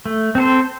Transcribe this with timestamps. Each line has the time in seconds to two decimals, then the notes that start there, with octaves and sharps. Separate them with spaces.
0.06 A3
0.35 C4 A4 C5